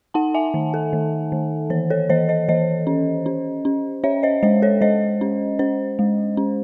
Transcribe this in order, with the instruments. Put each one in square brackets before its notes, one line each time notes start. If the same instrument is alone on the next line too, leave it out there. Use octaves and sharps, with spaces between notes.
[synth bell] D#4 F#5 A5
E5 G#5
D#3
A4
D#3
D#3
E3 C5
A4 C#5
E3 C5 D#5
C5 D#5
E3 C5 D#5
C#4
C#4
C#4
C#4 C#5 E5
C5 D#5
G#3 C5 D#5
A4 C#5
G#3 C5 D#5
C#4
C#4 C5
G#3
C#4